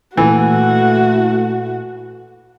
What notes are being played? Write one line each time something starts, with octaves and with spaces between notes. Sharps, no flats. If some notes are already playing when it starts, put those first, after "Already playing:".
A#2 E3 A3 E4 F#4